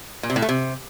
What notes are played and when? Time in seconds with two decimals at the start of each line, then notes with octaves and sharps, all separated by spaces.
0.23 A#2
0.30 C3
0.36 A2
0.42 A3
0.49 C3